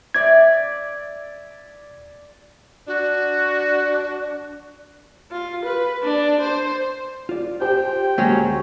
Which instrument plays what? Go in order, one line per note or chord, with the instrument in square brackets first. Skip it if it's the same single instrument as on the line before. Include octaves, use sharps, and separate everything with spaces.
[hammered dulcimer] D5 E5 [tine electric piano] G#6
[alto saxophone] D4 [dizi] F#4
[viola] F4
B4
D4
C5
[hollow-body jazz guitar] F4 D5
[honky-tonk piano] G4 C5 [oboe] G5
[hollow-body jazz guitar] D2 G#3 A#3 [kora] F#3 C#4